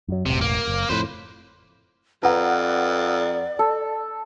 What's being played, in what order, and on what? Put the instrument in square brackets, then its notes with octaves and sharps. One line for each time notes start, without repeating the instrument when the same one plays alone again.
[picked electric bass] F#2 F#3
[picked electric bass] E1 A1 [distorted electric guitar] C3
[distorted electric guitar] A#3
[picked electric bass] F#1
[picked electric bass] F2 A2 [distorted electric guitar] B4 C5
[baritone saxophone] F2 [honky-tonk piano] B4 F#5 [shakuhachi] D5 [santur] A#5
[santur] A4